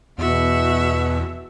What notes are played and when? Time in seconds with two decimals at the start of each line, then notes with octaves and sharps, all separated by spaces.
0.18 E2 B2 F#4 E5